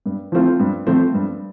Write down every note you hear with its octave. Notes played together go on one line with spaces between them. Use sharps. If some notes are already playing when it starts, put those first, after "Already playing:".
G2
F3 A3 C4 F4
G2
F3 A3 C4 F4
G2